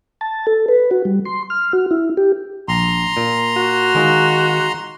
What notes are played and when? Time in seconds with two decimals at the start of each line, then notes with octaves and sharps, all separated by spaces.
0.21 A5
0.47 A4
0.68 B4
0.91 F#4
1.05 G3
1.26 C6
1.50 F6
1.73 F#4
1.91 E4
2.17 G4
2.68 A#1 A#5 C6
3.17 A#2
3.57 F#4
3.95 D#3 G#3 D#4 F4